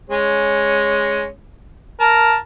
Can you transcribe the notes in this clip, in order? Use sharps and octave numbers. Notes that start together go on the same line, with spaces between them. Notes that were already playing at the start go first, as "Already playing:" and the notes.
G#3 C#4
A#4 A5